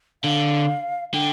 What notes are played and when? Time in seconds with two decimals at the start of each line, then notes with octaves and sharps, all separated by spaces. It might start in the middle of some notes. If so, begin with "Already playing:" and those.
0.24 D3 F5
1.13 D3 G5